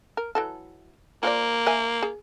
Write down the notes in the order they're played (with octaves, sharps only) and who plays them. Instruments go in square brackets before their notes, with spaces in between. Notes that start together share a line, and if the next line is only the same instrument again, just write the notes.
[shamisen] A#4
E3 F#3 A4
[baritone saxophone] A#3 [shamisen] F4 C5 D5
[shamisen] A#4 E5 G#5
G#4